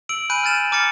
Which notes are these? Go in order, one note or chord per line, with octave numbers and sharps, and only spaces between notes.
E6 D7 F#7
G#5 B5 F#6 G6 D7 D#7
F6 G6 A6 E7
A#5 D6 F6 A6 C#7